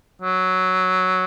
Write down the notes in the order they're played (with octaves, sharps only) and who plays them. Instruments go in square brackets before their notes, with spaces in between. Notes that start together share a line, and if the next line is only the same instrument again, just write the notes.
[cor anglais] F#3